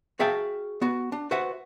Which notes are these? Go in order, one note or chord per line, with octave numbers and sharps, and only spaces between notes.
F#4 G#4 E5 F5 G5 A5
B3 F#4
D4
F#4 B4 C5 E5 F#5